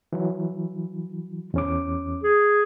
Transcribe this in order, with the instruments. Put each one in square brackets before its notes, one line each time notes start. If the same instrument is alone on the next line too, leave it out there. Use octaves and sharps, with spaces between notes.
[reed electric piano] E3 F#3
E2 C#4 D6
[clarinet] G#4